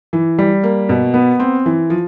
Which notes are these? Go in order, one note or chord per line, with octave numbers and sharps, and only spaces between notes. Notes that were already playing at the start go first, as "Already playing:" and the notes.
E3
G3
A#3
B2
B3
C4
E3
F3